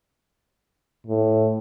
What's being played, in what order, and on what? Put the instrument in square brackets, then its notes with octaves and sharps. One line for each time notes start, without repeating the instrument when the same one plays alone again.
[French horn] A2